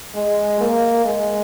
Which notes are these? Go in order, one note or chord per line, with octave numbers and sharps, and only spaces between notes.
G#3
A#3
G#3